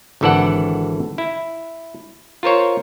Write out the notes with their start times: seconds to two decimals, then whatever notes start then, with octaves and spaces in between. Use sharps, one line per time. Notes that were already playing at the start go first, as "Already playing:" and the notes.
0.21 G#1 D3 E3 A4 D5 F#5
1.18 E4
2.43 F4 A#4 C5 C#5